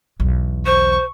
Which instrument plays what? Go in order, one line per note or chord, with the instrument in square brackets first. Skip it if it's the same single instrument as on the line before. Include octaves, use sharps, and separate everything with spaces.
[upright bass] B1 E2
[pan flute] C5 [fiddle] C#6